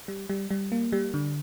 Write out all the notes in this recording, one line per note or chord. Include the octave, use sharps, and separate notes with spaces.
G3
G3
G3
A#3
G3
D3